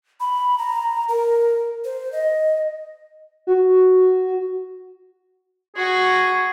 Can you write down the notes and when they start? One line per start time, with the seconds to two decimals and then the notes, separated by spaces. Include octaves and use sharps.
0.20 B5
0.58 A#5
1.08 A#4
1.84 C5
2.12 D#5
3.47 F#4
5.76 F#4 G#4 C#6